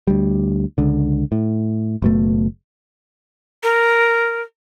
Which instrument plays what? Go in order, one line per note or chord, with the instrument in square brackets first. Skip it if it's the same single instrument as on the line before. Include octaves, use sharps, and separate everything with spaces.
[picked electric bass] D2 G3
C#2 D3
A2
F#1 B2 A3
[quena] A#4